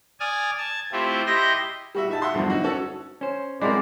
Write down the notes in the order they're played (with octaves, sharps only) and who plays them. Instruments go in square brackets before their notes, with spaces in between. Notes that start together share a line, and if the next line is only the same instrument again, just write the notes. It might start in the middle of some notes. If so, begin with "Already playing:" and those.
[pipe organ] D5 G#5 D#6 F6
A5 G#6
A3 C4 E4 F4 G4
E4 G4 D#5 G5 C6 A#6
[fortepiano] G3 F#4 E5
D#4 E5 A5
E5 F#5 C6 D#6
E2 G2 D3 F3 F#3
D#4 F#4
C#4 F#4 A4 C#5
[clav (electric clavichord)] C#4 C5
[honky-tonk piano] G#3 C4 G#4 [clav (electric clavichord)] E4 F#4 A#4 [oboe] D5